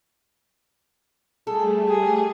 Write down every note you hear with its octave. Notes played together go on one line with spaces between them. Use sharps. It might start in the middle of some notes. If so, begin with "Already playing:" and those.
G3 A3 G#4 A4
G4 G#4